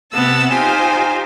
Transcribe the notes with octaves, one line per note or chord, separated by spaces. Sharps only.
C3 B3 A5 E6
D#4 F4 G4 C5 G#5